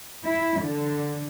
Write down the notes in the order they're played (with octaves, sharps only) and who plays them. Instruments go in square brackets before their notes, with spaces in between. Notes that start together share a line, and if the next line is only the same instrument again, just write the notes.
[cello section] E4
D3